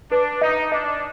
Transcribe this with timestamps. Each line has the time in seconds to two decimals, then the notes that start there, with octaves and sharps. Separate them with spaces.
0.11 D4 B4
0.42 D#4 D#5
0.71 D4 D#5